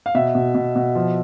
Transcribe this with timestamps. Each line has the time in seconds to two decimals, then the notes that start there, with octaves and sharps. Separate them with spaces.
0.06 F5
0.15 B2 E5
0.35 B2
0.55 B2
0.76 B2
0.95 F3